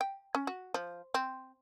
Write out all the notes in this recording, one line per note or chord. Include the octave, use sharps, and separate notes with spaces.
G5
C#4
F#4
F3
C4